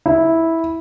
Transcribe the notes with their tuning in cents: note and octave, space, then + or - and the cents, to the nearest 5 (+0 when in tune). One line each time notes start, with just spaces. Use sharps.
E4 -10